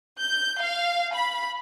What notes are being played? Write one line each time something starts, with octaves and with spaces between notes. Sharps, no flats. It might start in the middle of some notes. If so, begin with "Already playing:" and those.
G6
F5
B5